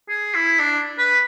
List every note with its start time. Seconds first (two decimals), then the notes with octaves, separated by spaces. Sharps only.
0.09 G#4
0.35 E4
0.59 D4
0.98 B4